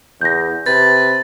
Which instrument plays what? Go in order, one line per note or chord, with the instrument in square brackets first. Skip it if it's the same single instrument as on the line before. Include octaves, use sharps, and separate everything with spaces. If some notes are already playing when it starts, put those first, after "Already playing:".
[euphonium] E2 [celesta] G6 A#6
[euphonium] C3 [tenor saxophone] B4 [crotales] A6